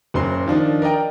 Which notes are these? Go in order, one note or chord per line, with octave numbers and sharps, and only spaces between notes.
F#1 C#3 F#3 C#4 C5 C6
D#3 F3 D4 D#4
A#4 D5 D#5 G5 A#5